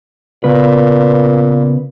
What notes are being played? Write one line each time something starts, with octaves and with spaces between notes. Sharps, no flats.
A#2 C#3 B3 B4